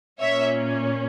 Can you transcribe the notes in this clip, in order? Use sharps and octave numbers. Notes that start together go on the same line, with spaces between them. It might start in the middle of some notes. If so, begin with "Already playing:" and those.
A#2 A#3 C#4 C#5 E5